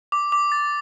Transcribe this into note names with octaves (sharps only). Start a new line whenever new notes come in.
D6
D6
A6